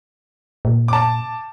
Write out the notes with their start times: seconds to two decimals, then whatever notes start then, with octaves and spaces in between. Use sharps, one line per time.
0.65 A#2
0.88 A5 D6